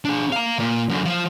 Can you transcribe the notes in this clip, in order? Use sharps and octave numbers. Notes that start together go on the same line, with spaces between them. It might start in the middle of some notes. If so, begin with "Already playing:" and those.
D4 G#4
F5 A#5
A#2
F#2 D3
F3